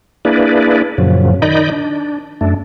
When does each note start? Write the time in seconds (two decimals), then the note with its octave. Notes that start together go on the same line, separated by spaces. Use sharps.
0.25 A#3 D4 E4 G#4 B4 D5
0.98 F#2 A#2 C#3 F3 F#3
1.42 D#3 D#4 D5 D#5 B5 G6
1.72 D4
2.41 F#2 A3 D4